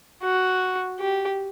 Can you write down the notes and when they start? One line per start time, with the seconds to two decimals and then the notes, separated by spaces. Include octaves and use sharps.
0.23 F#4
1.00 G4